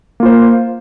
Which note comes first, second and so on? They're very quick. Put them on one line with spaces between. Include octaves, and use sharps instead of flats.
A#3 F4 C5